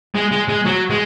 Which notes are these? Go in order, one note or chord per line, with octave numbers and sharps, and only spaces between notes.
G#3
G#3
G#3
F#3
G#3